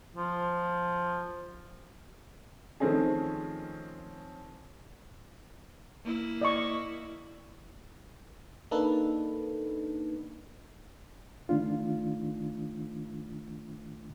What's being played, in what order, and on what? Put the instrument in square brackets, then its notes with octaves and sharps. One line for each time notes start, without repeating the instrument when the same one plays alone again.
[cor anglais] F3
[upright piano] D#3 F3 A3 C4 C#4 G#4
[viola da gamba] A#3 E4
[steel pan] D5 D#5 C#6
[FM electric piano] A#3 D4 D#4 A4 B4
[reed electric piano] D#3 A3 D4 F4